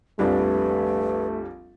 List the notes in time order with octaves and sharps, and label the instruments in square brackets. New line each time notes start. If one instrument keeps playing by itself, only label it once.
[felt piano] F1 A#1 D4 [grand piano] G3 [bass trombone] A3 [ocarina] B4